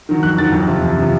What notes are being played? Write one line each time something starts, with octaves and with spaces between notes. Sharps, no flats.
D#3 F#3
F2 F#6
D#3 F#3 A6
F2
C3 F3
F2
C3 F3